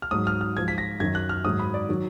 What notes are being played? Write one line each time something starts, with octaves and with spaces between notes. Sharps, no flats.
F6
G#2 F#3 D#6
F6
F6
G#2 F3 G#6
B6
A#6
F#2 D#3 F#3 G#6
F#6
F6
G#2 D#3 F#3 D#6
B5
D5
D#3 F#3